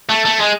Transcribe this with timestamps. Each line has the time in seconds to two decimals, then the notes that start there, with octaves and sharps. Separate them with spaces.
0.09 A3
0.25 A3
0.40 G#3